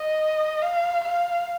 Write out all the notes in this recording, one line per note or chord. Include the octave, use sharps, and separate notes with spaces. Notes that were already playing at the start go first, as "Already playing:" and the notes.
Already playing: D#5
F5
F5